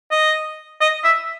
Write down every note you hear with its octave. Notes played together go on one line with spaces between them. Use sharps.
D#5
D#5
E5